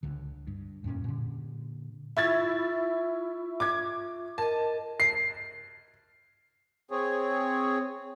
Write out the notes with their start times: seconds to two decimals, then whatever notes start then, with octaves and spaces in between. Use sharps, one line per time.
0.03 C#2 D3
0.47 G2
0.84 F2 A#2 B3 C#4
1.04 A#2 D3
2.17 E4 F4 E5 C#6 G#6 A6
3.60 D6 G#6
4.38 A#4 D#5 A5
5.00 C7
6.91 C4 G#4 C#5